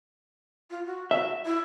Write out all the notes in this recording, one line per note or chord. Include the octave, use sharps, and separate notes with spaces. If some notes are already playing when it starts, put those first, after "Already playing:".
F4
F#4
F#4 E5
E4